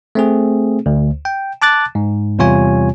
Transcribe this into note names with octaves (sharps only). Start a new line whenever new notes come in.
A3 C4 G#4
D2
G5
A5 D6 F#6 A6
G#2
E2 C3 G3 F4 C#5 G#5